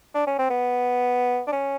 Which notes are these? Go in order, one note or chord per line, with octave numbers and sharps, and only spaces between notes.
D4
C#4
C4
B3
D4
C#4